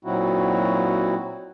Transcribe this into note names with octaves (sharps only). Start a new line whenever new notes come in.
A#2 F#3 C4 D#4 E4 F#4